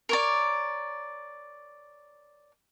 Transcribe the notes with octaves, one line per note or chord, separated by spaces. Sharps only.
A#4 C#5 D5